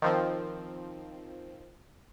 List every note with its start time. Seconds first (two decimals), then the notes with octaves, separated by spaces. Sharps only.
0.02 D#3 F3 C4